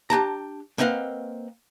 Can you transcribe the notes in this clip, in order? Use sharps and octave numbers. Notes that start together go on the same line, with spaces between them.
D4 G4 A5 A#5
A#3 C4 B4 D#5 F5 F#5